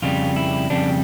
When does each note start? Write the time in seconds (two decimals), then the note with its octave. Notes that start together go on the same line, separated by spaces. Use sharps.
0.02 F2 C#3 G3 F4
0.36 E4
0.70 F2 C#3 G3 D4